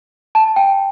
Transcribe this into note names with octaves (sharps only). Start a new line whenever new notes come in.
A5
G5